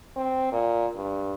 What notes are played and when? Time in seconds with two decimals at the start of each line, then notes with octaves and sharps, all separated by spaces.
0.16 C4
0.52 A#2
0.95 G2